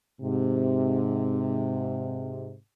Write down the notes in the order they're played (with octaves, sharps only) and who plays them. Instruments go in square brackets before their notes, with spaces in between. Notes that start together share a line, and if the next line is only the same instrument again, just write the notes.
[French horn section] G#2 C3